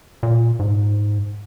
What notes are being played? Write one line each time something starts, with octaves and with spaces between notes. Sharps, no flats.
A#2
G#2